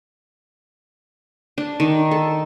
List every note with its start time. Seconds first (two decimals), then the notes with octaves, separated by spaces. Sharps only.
1.58 D4
1.80 D#3
2.11 A4